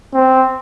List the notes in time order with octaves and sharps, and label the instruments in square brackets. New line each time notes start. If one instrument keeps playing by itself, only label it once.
[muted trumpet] C4